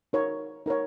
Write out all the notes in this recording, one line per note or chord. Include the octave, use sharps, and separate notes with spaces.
D#4 A#4 C#5
D#4 A#4 C#5